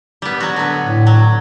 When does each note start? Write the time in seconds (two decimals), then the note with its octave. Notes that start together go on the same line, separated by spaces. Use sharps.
0.22 G3 B3
0.40 F#3 F#4
0.56 D3 B3
0.84 A2
1.07 F#3